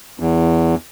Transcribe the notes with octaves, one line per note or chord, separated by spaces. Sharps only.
E2